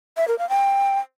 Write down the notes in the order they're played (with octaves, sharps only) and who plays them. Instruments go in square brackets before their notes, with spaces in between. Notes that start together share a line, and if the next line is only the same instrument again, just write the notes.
[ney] E5
A#4
F5
G5